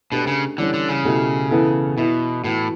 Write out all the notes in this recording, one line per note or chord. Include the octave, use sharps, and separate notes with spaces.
B2 A3 D4 G4 B4
C#3
D3 E3 G3 C#4
D3
C#3
B2 A3 E4 G4
E3 B3 E4 A4
B2 E3 B3 E4
A2 E3 B3 F#4